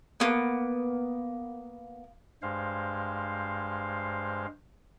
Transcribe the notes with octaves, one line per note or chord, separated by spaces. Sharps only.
A#3 B3
G2 G#3 C5 F5